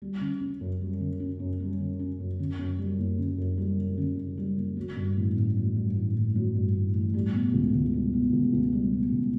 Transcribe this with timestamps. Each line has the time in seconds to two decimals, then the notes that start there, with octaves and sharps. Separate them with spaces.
0.02 G3
0.21 C#3
0.41 C#4
0.61 F#2
0.81 G3
1.00 C#3
1.20 C#4
1.40 F#2
1.60 G3
1.80 C#3
1.99 C#4
2.19 F#2
2.39 C#3
2.59 F#2
2.78 G3
2.98 F#1
3.18 C#3
3.38 F#2
3.58 G3
3.78 F#1
3.98 C#3
4.17 F#2
4.37 G3
4.57 F#1
4.76 F#3
4.96 G2
5.17 A1
5.36 A1
5.56 F#3
5.76 G2
5.95 A1
6.15 A1
6.35 F#3
6.55 G2
6.75 A1
6.94 A1
7.14 G3
7.34 B2
7.54 C#2
7.74 C#2
7.94 G3
8.13 B2
8.33 C#2
8.53 C#2
8.72 G3
8.93 B2
9.12 C#2